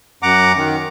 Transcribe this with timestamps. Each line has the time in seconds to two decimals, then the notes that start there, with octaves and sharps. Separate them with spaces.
0.23 F#2 F#5 A#5 D6
0.56 D#3